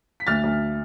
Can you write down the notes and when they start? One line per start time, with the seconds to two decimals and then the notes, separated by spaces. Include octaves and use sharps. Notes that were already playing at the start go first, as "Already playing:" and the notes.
0.20 B6
0.27 D2 F6 A6
0.44 D2